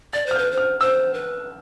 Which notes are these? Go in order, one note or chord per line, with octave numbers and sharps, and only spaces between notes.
D5 A6
C5 F6
G6
B4
C5
F6
C5 E6
B4